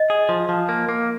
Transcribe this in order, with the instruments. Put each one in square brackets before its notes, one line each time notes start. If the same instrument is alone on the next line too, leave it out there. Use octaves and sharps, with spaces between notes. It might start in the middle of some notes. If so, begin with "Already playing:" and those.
Already playing: [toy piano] D#5
[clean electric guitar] G#4
F3
F3
A#3
A#3